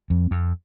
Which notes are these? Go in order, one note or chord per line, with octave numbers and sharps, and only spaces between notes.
F2
F2